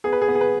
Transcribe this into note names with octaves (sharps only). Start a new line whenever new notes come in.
B3 G#4
B4
G#4
B3
G#4
B4